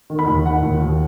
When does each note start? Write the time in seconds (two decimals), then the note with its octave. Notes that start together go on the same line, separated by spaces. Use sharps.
0.10 D#3
0.19 B5
0.27 D#2
0.45 D#3 F#5
0.63 D#2
0.81 D#2